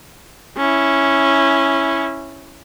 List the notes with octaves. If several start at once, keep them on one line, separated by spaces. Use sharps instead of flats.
C#4 E4